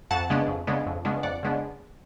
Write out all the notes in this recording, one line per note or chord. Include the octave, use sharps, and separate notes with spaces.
F2 F#5 A5
C#3 G#3 B3 D4
F2
C#3 G#3 B3 D4
F2
C#3 G#3 B3 D4
F2 D5 F#5
C#3 G#3 B3 D4